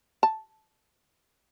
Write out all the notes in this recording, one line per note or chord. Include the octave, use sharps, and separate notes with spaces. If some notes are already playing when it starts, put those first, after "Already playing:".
A5